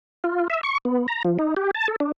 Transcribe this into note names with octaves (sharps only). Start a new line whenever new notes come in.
F4
E5
C#6
B3
A#5
F3
D#4
G4
A5
A4
D4